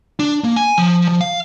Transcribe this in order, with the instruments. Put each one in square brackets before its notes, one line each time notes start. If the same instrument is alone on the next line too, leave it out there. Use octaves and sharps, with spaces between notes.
[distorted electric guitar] D4
A#3
G#5
F3
F3
F5